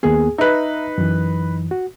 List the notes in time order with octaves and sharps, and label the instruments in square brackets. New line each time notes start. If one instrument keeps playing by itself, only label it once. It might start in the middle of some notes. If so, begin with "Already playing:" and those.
[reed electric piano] D#2 A#3 B3 [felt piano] G#4
[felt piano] D#4 B4 [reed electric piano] E5 A#5
[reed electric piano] F#2 E3
F#4